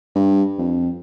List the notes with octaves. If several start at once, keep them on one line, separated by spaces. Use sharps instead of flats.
G2
F2